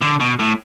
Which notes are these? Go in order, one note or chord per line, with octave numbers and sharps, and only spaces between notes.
D3
B2
A2